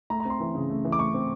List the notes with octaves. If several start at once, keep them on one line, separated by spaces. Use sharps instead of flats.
A3 A#5
A#5
C4 C6
E3
C#3
A3
E3
D6
A3 C#6
C4